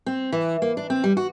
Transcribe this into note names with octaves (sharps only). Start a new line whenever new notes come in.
C4
E3
A#3
D4
C4
G3
F#4